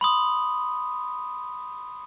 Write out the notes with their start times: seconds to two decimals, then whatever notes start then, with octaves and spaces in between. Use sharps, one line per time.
0.01 B5 C6 D#6